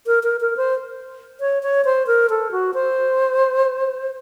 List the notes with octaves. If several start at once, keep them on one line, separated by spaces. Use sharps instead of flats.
A#4
A#4
A#4
C5
C#5
C#5
C5
A#4
A4
F#4
C5